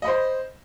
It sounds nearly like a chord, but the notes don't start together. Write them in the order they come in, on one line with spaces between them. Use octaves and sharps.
D#5 B5 C5